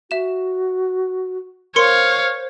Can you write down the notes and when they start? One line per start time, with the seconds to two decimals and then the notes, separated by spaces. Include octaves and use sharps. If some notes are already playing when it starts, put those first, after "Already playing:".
0.11 F#4 E5 E7
1.76 A#4 C5 C#5 F5 C6 C#7